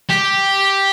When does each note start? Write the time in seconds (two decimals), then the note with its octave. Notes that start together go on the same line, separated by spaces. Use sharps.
0.10 G4